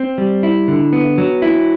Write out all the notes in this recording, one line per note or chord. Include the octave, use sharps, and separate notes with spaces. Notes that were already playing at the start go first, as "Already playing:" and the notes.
Already playing: C4
G3
E4
D3
B3
F#3
E4